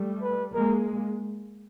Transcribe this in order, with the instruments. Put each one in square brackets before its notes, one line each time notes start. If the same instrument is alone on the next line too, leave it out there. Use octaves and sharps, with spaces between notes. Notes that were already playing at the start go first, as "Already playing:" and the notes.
Already playing: [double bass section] G3 A3
[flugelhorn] B4
[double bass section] G#3 A#3 [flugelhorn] A#4